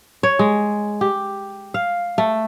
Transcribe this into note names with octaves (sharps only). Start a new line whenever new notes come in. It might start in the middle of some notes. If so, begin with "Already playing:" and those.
C#5
G#3
G4
F5
A3